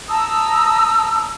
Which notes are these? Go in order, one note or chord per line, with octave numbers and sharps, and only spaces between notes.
A5 A#5 D#6 E6